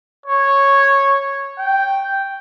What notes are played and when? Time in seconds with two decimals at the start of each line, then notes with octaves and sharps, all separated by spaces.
0.26 C#5
1.59 G5